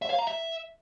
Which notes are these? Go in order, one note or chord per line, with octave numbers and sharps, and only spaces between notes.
E5
F5
A#5
E5